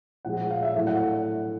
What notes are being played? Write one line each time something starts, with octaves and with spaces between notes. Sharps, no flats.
A#2 F3 G#3 F#5
F#5
F5
E5
A2 F#3 A3 E5
F#5